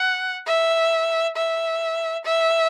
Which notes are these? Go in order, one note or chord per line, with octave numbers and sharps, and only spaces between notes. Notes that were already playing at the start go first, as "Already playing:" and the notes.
Already playing: F#5
E5
E5
E5